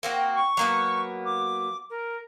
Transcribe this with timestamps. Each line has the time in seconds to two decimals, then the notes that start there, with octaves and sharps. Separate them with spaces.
0.03 A#3 C4 F#4
0.35 C#6
0.57 F#3 A#3 B3
1.25 D6
1.90 A#4